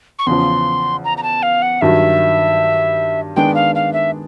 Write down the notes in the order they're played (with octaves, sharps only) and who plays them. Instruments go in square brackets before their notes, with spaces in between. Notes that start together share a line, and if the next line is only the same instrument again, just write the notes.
[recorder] C#6
[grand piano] E2 C#3 F3 [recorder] C6
[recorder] A#5
A#5
A5
F5
F#5
[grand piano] G2 D#3 F#3 [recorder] E5
[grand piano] D#3 G#3 B3 D4 [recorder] G5
[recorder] F5
F5
E5